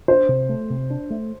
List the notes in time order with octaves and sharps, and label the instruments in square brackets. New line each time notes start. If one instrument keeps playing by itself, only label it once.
[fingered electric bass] D4 [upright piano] C5
[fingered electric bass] C3
A3
C3
D4
A3